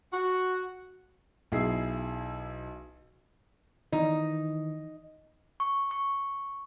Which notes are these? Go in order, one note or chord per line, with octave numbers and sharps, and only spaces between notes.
F#4
B1 E4 G#4 C7
D#3 E3 D#4
C#6
C#6